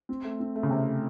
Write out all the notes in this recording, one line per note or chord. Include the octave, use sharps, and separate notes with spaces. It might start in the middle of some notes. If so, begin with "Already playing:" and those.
C4
A3
C4
A3
C#3
C3 A3
A3